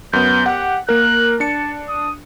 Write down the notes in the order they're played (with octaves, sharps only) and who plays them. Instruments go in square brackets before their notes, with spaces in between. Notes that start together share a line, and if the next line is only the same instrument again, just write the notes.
[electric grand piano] F#2 B3 [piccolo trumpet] G6
[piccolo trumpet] G4 [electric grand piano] F#5
[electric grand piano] A#3 A#4 [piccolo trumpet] F#6
[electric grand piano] D4 C#7 [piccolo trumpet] A5
[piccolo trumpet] D#6